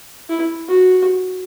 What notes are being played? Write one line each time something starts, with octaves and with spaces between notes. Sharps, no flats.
E4
F#4